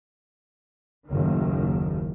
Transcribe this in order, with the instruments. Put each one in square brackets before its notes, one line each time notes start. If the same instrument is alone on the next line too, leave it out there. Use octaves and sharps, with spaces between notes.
[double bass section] F#1 D#2 A2 D#3